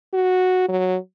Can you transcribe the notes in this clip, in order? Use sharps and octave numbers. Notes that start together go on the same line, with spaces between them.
F#4
F#3